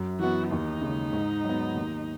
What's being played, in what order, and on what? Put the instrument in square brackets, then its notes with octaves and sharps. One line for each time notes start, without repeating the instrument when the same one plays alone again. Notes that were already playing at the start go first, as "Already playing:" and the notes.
Already playing: [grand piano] F#2
[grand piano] E3 B3 [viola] F#4
[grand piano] D#2 [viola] D#4
[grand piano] C#3 G#3
G#2
F#3 B3
D#2